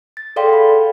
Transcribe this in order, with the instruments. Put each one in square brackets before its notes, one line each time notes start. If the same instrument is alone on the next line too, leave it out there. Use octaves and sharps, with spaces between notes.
[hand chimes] A6
G#4 A4 D5 F5 G5 C6
F#5 B5